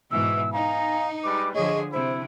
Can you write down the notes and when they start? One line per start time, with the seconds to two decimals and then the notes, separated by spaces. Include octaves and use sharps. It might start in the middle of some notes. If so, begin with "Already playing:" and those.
0.11 G#2 B2 E3 E6
0.53 D#4 F5 G#5 A#5
1.23 G3 G#3 B4 D6
1.54 D3 F3 G#4 C#5 D#5
1.93 C3 E4 C5